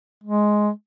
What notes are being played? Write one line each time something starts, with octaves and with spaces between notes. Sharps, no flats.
G#3